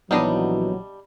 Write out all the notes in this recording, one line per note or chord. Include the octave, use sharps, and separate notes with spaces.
A#1 E3 F#3 G3 B3 D4 D#4 D#5